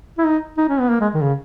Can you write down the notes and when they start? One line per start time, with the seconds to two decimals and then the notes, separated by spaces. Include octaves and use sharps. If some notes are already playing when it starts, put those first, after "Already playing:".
0.18 E4
0.26 D#4
0.58 D#4
0.69 C#4
0.80 B3
0.91 A#3
1.00 G#3
1.14 D#3
1.22 C#3